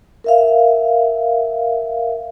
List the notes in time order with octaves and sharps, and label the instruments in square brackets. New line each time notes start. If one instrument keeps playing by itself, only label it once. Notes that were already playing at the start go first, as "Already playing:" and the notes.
[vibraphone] A#4 E5 F5